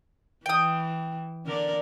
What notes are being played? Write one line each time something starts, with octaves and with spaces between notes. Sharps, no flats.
E3 G5 D#6
D3 A#4 D5